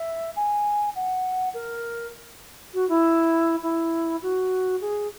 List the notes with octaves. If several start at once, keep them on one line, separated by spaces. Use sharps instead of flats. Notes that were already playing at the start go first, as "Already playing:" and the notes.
Already playing: E5
G#5
F#5
A#4
F#4
E4
E4
F#4
G#4